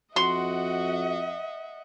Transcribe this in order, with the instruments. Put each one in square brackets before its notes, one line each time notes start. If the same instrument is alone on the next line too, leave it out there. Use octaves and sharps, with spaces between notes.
[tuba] F2 [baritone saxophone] F#4 [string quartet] D#5 E5 F#5 [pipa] C6